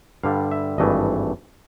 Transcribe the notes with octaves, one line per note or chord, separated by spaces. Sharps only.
G2 D3 G3 F5
E5
G#1 G2 E3 A3 D#5